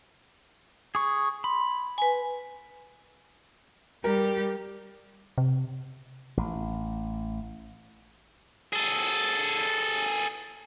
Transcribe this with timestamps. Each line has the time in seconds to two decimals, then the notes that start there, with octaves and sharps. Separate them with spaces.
0.95 G#4 C#6
1.44 B5 C6
1.98 B4 G#5
4.04 G3 G4 A#4
5.38 C3
6.37 A1
8.73 G#4 A4